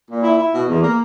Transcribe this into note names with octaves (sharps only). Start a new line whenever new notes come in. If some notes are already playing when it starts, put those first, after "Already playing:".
A#2
E4
E4
B2
E2
A#3